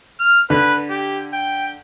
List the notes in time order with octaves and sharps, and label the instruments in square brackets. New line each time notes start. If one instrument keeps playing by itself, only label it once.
[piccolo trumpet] F6
[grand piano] D3 [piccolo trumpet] B4
[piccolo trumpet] G4
G5